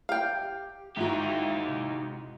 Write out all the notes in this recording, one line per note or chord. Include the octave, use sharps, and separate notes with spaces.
G4 F5 G5
G#2 D#4 E4 F#4 G4 E5
C3